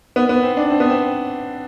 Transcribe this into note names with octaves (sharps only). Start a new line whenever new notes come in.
B3
B3
C4
D4
C4
B3
C4